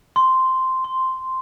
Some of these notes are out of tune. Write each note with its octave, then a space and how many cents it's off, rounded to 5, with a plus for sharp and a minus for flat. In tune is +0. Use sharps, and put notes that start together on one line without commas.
C6 -5
C6 +0